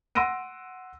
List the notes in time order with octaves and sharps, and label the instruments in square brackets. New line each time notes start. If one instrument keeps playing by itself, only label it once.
[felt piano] F#5 C6 E6 A#6 D7 D#7